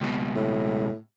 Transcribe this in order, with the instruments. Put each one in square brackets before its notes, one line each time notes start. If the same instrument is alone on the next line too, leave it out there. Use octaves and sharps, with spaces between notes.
[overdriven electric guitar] C#2 B2
[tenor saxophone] A2